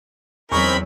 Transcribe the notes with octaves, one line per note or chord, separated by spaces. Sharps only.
E2 F#3 C4 D#4 G#4 A#4 B5 C#6